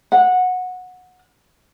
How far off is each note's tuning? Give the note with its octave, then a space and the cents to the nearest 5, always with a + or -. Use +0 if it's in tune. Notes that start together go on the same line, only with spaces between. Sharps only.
F#5 -15